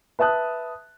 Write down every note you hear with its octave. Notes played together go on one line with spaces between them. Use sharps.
B4 E5 A5 D#6 F#6